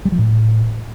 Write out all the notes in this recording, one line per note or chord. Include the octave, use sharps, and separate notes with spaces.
G3
F3
A2